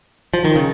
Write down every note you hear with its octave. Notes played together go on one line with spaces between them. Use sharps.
F3
D#3
C#3